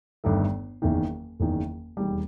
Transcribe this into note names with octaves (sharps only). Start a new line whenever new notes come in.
G1 G2 D#3 A3
F#1 E2 D#3
F#1 E2 D#3
E1 D#2 D#3 G3